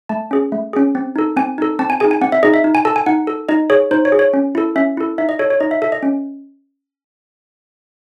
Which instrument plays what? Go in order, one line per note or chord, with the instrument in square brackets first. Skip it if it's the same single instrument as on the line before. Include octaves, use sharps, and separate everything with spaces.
[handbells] A3 A5
C#4 G#4
A3
C#4 G#4
C4
D#4 A4
C4 G#5
D#4 A4
C4 A5
G#5
D#4 G#4 G#5
G#5
C4 F#5
E5
D#4 G#4 D#5
E5
D#4
G#5
A4 A5
G#5
D#4 F#5
A4
D#4 D#5
G#4 C#5
D#4 C5
C#5
G#4
C#5
C#4
E4 A4
C#4 E5
E4 A4
D#4 E5
D#5
A4 C#5
C#5
D#4 D#5
E5
A4 E5
D#5
C#4